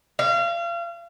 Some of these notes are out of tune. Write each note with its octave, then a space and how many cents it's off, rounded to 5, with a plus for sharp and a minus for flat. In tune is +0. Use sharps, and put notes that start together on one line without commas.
F5 -35